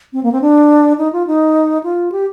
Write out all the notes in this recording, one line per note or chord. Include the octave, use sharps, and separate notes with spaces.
C4
A#3
C4
D4
D#4
F4
D#4
F4
G4